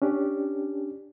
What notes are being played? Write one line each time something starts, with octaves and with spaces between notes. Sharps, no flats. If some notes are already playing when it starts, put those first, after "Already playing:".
C#4 D4 G4